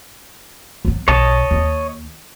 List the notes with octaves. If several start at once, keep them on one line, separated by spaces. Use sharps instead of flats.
F#3 B3
B1 C#5 D#5 A5
D#2 D#4